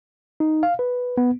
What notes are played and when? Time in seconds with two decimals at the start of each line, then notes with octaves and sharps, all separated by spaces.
0.40 D#4
0.63 F5
0.79 B4
1.18 B3